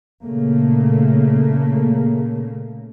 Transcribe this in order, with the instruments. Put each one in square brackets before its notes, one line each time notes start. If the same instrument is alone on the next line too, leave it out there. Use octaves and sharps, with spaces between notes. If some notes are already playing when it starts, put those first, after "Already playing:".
[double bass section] A#2 C#3 A3 A#3